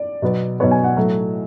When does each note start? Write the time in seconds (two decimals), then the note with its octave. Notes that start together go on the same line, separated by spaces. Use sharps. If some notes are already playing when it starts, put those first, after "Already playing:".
Already playing: D5
0.22 B2 F#3 B3
0.60 B2 F#3 B3 C#5
0.71 G#5
0.84 F#5
0.97 A2 F#3 A3